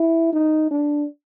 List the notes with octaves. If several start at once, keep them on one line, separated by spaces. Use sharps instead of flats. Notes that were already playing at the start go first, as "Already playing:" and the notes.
Already playing: E4
D#4
D4